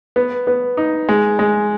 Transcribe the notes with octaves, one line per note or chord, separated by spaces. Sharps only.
B3
B3
D#4
G#3
G#3